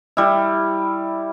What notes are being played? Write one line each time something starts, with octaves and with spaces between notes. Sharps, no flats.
G3 E4